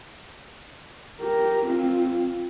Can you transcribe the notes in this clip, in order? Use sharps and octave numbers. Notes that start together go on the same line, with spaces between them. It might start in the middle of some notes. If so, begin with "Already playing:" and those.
G4 A#4
C4 F4